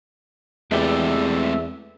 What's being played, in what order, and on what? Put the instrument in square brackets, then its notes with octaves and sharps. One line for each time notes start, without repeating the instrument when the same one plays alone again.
[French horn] E2 [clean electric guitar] G#3 A3 G4 [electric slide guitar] C4 B4 D5 [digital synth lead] E5